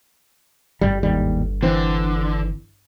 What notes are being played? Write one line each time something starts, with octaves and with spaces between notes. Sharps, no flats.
G1 G3
D#2 G#2 G3
D3 E3 C4